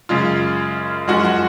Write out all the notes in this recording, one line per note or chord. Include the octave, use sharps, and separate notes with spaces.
F#2 C#3 G#3 F4
F#2 F3 G#3 F#4
F#4